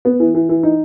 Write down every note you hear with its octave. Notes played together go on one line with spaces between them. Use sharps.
B3
E3
E3
E3
D#4